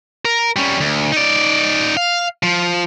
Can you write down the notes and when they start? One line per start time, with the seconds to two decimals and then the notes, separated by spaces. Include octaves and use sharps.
0.25 A#4
0.56 G3 C#4
0.80 D2
1.12 D#4 D5
1.97 F5
2.43 F3